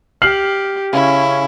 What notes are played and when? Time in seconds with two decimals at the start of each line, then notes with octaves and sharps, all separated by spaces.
0.22 G4 F6 C7 F#7
0.93 C#3 C#4 E4